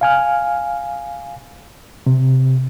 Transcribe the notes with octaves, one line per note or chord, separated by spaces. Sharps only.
F5 G#5 F6
C3